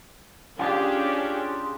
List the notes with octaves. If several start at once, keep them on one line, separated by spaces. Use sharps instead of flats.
C#4 D4 F4 G4 G#4